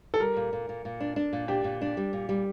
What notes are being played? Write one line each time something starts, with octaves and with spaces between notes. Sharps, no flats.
A4
G3 A#4
A#2
A#2
A#2
A#2
D4
D4
A#2
D4 G4
A#2
D4
G3
A#2
G3